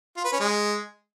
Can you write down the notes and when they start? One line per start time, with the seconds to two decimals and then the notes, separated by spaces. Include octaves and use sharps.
0.17 F4
0.25 B4
0.32 C#4
0.40 G#3